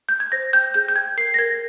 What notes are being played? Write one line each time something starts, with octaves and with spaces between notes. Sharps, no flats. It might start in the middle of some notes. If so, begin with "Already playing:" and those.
G6
G#6
C5 A#6
G5 G6
G#4 G6
G6
G5 G#6
A#4 C7
A#6
A#4 G#6